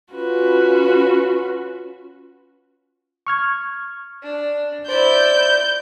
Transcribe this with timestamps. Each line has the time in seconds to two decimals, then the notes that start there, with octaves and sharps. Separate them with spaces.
0.14 C#4 F4 F#4 B4
3.27 C#6 F6 G#6
4.23 D4
4.89 E4 C5 D5 G6